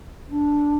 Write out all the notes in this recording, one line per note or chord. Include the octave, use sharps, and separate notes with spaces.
D4